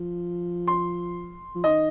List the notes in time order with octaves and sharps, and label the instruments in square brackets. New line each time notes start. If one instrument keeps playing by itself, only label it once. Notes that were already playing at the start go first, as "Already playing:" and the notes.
Already playing: [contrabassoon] F3
[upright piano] C6
[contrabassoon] F3
[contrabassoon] D#3 [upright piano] D#5